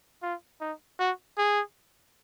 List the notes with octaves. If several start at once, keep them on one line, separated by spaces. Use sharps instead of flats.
F4
D#4
F#4
G#4